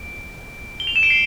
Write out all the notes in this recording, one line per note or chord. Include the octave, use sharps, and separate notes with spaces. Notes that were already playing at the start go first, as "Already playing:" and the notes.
Already playing: D7
G7
F7
E7
D7
C7